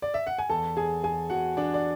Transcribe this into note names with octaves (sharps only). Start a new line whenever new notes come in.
D5
E5
F#5
G#5
E2 A4 A5
E2 G#4 G#5
E2 G#4 G#5
E2 F#4 F#5
E2 D4 D5
D5